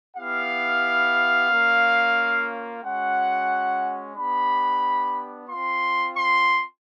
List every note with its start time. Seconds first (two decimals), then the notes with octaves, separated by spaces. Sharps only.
0.17 B3 E4 G4 F5
1.50 A#3 C#4 F4
2.82 G#3 C#4 F#4 F#5
4.16 B3 D4 G4 B5
5.48 C4 F4 C6
6.15 C6